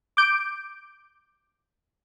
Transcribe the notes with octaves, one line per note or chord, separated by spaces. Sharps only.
D6 G6 D7